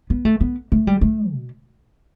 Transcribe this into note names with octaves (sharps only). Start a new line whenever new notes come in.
B3
A3
B3
A3
G3
A3
B2